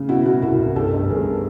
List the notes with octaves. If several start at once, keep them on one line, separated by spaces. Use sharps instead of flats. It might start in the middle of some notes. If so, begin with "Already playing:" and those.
Already playing: C#3
B2 E4 F#4
B2 E4 F#4
C2 E4 F#4
C2
G1 G4 A4
G2
G1 G#4 A#4